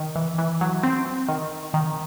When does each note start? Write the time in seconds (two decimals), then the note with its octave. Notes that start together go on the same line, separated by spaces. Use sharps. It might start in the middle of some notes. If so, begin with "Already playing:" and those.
Already playing: D#3
0.16 E3
0.38 E3
0.61 F#3
0.83 C4
1.28 D#3
1.74 D#3